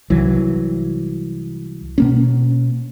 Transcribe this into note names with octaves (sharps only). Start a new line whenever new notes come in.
C2 E3 F#3
B2 A#3 C#4